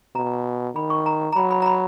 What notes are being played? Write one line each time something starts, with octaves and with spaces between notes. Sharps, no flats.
B2 A#5
D#3 B5
C#6
A#5
A#5
F#3 B5
B5
A#5
B5